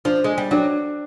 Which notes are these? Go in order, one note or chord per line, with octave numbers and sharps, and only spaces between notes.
F3 D4
G#3
G3
F#3 D4